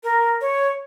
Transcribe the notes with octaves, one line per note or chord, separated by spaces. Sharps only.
A#4
C#5